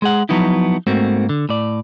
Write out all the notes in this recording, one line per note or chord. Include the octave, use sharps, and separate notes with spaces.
G#3 G#4 F#5
F3 F#3 B3 D#4 E4
G#2 A3 A#3 C4 F#4
D3
A2 D5